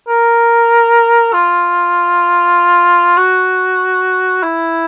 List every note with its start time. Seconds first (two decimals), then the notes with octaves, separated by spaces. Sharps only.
0.08 A#4
1.33 F4
3.18 F#4
4.43 E4